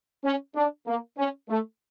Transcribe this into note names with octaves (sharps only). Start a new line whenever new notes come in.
C#4
D4
A#3
C#4
A3